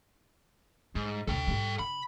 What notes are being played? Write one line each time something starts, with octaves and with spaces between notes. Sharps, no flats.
G#2 G3
D2 C3 A4 G5
G#2 G3
C#3 B5